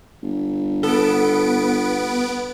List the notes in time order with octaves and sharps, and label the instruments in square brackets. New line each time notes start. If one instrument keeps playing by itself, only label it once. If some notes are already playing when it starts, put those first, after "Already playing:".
[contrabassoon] G1
[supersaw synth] B3 D7 [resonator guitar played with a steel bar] A4